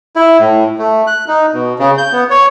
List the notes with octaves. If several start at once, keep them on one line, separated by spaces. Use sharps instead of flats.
E4
A2
A3
F#6
D#4
B2
C#3
G6
B3
C#5